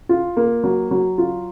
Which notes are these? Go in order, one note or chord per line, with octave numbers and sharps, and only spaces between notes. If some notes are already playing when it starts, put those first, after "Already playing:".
F4
A#3
F#3
F#3
F4